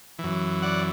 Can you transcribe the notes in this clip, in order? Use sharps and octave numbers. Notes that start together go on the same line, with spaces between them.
F#2 E3
D5 F#5